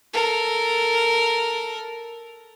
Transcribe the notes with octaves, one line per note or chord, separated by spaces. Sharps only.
A4 A#4